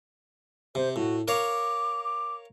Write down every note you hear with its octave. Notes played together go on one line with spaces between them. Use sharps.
C3 C5
A2 F#4
A#4 C#5 F5 D6
D6